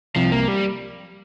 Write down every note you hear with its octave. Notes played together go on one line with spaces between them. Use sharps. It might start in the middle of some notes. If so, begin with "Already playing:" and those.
C2 C3 F3
A#3
G3